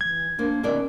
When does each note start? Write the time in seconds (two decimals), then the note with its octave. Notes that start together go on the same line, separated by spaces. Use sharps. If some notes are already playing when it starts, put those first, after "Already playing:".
0.01 E3 G#6
0.39 A#3 D4 C5
0.63 B2 D#3 C#4 D5